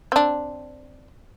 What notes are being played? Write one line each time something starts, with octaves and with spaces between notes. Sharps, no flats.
C4 D4